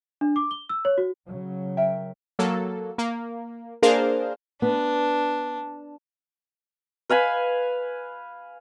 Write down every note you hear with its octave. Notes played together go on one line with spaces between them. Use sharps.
D4
D6
G7
E6
C#5
F#4
C#3 F#3
A#4 E5 G5
F#3 A#3 A4
A#3
A#3 D4 G#4 A#4 C5 F5
B3 D4
B4 F5 G#5 B5